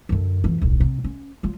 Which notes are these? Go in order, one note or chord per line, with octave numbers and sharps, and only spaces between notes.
F#2 D3
F2 E3
D1 B1
C3
C#4
F#3 F4